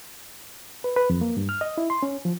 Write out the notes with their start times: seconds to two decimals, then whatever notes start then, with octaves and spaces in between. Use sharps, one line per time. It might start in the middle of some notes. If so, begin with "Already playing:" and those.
0.84 B4
0.96 B4
1.10 F2
1.21 A#3
1.37 G2
1.49 F6
1.61 D#5
1.78 E4
1.90 C6
2.03 C#4
2.25 F3